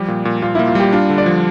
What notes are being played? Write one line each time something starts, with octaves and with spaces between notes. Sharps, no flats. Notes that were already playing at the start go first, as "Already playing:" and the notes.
Already playing: F3 G3 G4
A#2
A#2
A#2 F4
E4
A#3
F4
G3 G4
D4 F4
D3
D5
F3